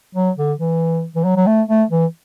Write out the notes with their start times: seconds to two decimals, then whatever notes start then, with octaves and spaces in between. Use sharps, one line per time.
0.15 F#3
0.38 D3
0.60 E3
1.15 E3
1.25 F#3
1.37 F#3
1.47 A3
1.68 A3
1.90 E3